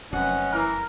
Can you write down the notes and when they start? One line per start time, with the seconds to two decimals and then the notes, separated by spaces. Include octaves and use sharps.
0.13 F1 F#2 C3 C#4 B4 D#5 F#5
0.52 E3 A#4